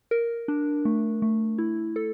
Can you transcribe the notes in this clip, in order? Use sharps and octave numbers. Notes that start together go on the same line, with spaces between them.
A#4
D4
A3
A3
E4
A4